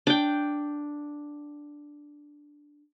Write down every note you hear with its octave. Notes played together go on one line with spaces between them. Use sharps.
D4 G5